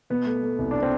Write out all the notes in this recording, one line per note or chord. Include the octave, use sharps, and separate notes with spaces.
B2 B3
A3
A3
C2
D4
C4